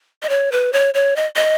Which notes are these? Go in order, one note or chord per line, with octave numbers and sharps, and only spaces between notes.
D#5
C#5
B4
C#5
C#5
D#5
D#5